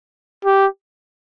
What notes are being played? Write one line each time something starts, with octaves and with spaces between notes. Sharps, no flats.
G4